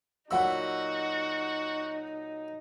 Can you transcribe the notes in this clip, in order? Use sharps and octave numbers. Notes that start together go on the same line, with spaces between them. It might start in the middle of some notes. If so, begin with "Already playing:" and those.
A#2 F#3 D#4 F#4 F#5 B5 E6